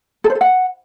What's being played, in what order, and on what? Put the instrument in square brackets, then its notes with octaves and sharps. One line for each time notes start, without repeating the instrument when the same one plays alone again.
[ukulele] A4
C5
A4
F#5